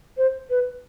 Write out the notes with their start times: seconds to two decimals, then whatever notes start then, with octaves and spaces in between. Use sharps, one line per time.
0.17 C5
0.50 B4